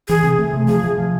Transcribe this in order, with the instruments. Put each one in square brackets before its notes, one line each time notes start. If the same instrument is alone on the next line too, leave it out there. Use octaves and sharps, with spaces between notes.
[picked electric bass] E3 [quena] G#4
[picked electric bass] C3
A3
C3
[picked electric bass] F3 [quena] G#4
[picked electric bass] C3
F3